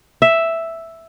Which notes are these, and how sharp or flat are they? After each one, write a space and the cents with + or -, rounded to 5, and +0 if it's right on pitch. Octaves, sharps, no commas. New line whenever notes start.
E5 +0